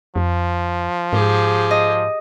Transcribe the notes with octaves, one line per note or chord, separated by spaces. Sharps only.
F2 F3
G#2 G4 G#4
D#5